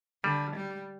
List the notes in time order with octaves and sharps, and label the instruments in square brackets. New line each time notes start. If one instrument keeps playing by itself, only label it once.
[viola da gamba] D3 [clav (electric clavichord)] G3
[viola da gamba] G3